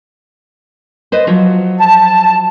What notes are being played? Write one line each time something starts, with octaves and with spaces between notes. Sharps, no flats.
B4 C5 D#5
F3 F#3 F4
A5